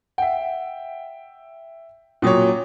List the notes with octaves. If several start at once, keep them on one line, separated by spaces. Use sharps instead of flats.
E5 F#5 G5
A#2 F#3 C#4 C#5 D#6